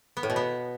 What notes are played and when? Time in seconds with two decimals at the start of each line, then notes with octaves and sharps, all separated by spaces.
0.17 B3
0.23 A2
0.30 B2
0.36 B3